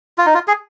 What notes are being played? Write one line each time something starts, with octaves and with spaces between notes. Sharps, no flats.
F4
D#4
F4
G#4